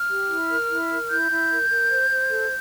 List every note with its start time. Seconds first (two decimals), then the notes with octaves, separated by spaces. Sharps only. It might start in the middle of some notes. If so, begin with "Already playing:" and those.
Already playing: F6
0.09 G4
0.29 E4
0.50 A#4
0.69 E4
0.89 A#4
1.09 E4 G6
1.30 E4
1.50 A#4
1.69 A#4
1.89 C5
2.10 C5
2.30 A4